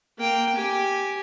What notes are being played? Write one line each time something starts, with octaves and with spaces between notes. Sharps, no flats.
A#3 G5
G4 G#5